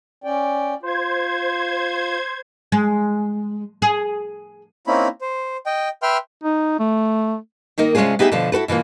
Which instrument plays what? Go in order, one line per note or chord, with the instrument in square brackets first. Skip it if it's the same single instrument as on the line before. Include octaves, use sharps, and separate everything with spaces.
[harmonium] C#4 D5 G5
[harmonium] F4 [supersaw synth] C5 G#6
[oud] G#3
G#4
[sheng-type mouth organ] A#3 C4 C#4 D#4 E4 B5
C5
D#5 G5
B4 E5 G5 C6 F6
[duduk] D#4
A3
[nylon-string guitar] D#3 A#3 D#4 A#4
C3 G#3 C#4 D4 F4 G#4
B3 D#4 G4 G#4 E5
B2 D3 F3
E4 F#4 A4 B4
B2 E3 A#3 F4